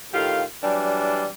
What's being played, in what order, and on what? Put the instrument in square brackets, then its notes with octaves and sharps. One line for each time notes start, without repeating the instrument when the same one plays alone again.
[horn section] A2 D#3 F4 G4 F5
E3 F#3 G3 D4